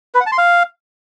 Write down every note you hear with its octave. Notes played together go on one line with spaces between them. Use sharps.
B4
F#5
A5
C6
F5